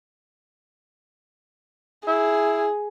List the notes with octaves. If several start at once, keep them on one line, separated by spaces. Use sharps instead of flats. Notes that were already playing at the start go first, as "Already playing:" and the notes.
E4 G#4